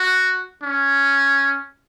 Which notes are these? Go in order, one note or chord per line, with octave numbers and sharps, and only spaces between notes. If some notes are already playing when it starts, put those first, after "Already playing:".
Already playing: F#4
C#4